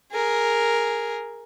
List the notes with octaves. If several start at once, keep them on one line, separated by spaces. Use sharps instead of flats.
G#4 A#4